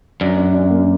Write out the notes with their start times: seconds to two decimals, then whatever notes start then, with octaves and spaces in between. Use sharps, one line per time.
0.21 F#2 D4
0.37 D4
0.54 D4
0.71 A#3